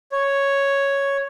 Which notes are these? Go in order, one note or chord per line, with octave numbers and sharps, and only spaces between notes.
C#5